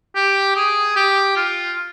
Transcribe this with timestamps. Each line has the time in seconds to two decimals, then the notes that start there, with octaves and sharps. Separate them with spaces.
0.16 G4
0.56 G#4
0.96 G4
1.36 F4